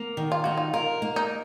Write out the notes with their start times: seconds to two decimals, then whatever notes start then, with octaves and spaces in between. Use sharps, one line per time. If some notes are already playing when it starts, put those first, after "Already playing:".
Already playing: A#3
0.17 D#3
0.32 F4
0.44 D#4 F#4
0.57 F4
0.74 F4 A#4
1.02 A#3
1.16 D#4